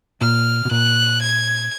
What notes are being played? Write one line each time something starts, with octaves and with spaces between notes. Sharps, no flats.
A#2 F6
B2
A#2 F#6
G#6